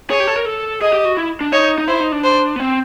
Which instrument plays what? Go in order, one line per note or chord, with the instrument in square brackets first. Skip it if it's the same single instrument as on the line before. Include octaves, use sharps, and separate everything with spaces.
[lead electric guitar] G#4 [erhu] C#5
[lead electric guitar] G4
A4
A#4
A4
[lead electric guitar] G#4 [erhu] D#5
[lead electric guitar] G4
F#4
E4
D4
[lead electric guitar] D#4 [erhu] C#5
[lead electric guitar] D#4
[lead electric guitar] E4 [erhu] C5
[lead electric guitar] D#4
D4
[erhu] C5
[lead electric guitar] B3
C4